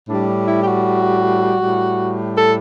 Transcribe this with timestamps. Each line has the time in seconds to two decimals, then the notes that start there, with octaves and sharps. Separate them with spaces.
0.08 A2 G3 D4
0.46 E4
0.60 G4
0.65 F#4
1.59 A2 G3
2.35 A4